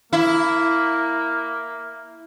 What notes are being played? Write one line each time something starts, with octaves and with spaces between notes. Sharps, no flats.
A#3 E4